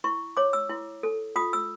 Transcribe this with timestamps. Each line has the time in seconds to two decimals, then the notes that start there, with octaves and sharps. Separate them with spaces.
0.04 E4 C#6
0.37 C#5 D6
0.53 E6
0.69 E4
1.03 A4
1.36 F4 D#6
1.53 E6